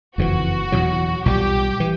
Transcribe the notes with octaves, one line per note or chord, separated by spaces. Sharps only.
F#1 F2 C3 E3 F#4
E2 B2 F#3
B1 A#2 G3 G4
E3